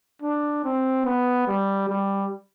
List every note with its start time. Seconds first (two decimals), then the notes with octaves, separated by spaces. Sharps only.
0.22 D4
0.64 C4
1.06 B3
1.47 G3
1.89 G3